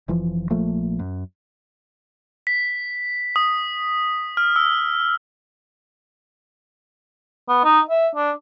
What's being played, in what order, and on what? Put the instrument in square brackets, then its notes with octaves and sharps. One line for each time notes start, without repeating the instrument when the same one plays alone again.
[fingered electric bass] F1 E3 F3
A#1 F3 A3 A#3
F#2
[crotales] B6
D#6
F6
E6
[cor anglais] B3
D#4
E5
D4